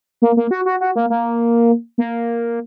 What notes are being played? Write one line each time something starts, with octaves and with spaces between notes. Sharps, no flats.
A#3
A#3
F#4
F#4
F#4
A#3
A#3
A#3